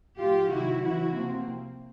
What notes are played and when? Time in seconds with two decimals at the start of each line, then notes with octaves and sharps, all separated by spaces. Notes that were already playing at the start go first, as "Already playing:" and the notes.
0.18 A2 F3 F4 G4
0.50 C3 D#3 F#3 E4 F#4
0.82 C#3 E3 E4 F#4
1.13 C3 F3 A#3 C4